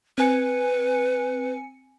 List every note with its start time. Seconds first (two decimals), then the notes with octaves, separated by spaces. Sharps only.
0.18 C4 B4 G#5 C#7